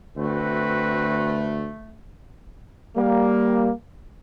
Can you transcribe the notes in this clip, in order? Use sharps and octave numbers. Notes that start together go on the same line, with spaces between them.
D2 A3 C4 F#4 B4
G3 A#3